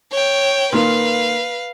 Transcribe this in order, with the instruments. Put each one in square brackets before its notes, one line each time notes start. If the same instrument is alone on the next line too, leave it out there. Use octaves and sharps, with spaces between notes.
[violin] C#5 G5
[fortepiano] A#2 D#3 [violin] B4 F5